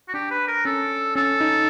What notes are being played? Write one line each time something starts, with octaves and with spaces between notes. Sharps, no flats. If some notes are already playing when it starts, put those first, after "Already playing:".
F#4
D4 G4
B4
A#4
C#4 A4
C#4 A4
D#4